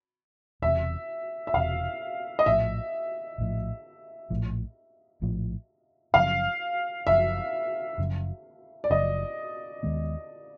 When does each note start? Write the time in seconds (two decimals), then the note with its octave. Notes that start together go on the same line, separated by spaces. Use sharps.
0.62 E1 E2 C3 E5
1.47 E5
1.54 E1 E2 C3 F5
2.39 D#5
2.46 A#1 A2 F3 E5
3.38 A#1 A2 F3
4.30 A#1 A2 F3
5.22 A#1 A2 F3
6.14 F#1 F#2 C#3 F3 F5
7.07 F#1 F#2 C#3 F3 E5
7.98 F#1 F#2 C#3 F3
8.84 D5
8.90 F#1 F#2 C#3 F3 D#5
9.83 D#2 D#3 G#3 B3